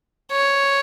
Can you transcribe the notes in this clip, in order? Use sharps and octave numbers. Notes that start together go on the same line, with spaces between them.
C#5